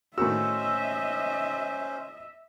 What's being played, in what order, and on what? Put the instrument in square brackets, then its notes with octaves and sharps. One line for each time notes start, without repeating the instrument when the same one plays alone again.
[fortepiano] A2 D#3 F#4 [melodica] C#4 C5 [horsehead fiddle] D#5 E5 [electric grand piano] E6